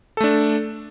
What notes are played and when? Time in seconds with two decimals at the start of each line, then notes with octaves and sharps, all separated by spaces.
0.17 A4
0.20 A3
0.24 D4